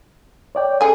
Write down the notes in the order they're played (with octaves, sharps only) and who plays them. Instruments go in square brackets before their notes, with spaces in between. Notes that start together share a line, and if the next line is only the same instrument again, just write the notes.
[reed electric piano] C#5 D5 G5
[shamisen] C#3 G#4 G#5 [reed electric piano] A4